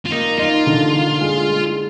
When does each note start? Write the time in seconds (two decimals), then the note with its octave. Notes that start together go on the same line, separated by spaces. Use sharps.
0.05 F4
0.11 A#3 D#4
0.38 D#4 F4
0.67 D3
0.93 D3
1.21 G#3
1.49 G#3